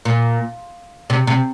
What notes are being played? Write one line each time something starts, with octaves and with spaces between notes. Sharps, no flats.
A#2
C3
C3